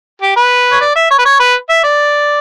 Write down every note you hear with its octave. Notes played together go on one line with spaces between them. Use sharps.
G4
B4
C#5
D5
E5
C#5
B4
C#5
B4
E5
D5